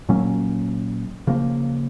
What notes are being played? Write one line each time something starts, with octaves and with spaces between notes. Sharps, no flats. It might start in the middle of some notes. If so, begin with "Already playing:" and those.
A#2 F#3 A#3 C#4
C#3 F3 A#3